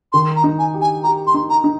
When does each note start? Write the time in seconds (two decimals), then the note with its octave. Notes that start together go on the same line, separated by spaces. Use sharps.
0.13 D#3 C6
0.36 A#5
0.44 D#4
0.59 G#5
0.74 G4
0.81 G#5
1.03 G4 A#5
1.27 C6
1.34 D#4
1.50 A#5
1.64 D#4